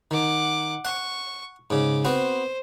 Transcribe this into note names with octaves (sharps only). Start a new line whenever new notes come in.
D#3 F#5 D6
F#5 C#6
G#2 C#3 D6
B3 C4 F#4 C5